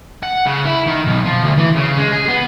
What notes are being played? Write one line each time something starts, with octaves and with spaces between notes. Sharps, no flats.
F#5
C#3
E4
D#3
B1
F3
D2
E3
C#3
G#3
G#4
B3